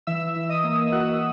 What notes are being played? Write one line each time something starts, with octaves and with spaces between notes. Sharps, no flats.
E3 E5 E6
E3
D#5 D#6
A#3
A#3 F#4 F#5